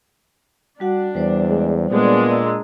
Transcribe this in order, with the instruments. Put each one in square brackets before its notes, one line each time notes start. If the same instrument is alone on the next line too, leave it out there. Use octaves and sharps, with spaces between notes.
[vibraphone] G3 F#4 F#5 [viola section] D4
[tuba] E2 [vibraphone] G3 C5 D5
[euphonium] G#3
[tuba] A#2 [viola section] G#3 D4 [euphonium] B3
[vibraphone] D#5 A#5 E6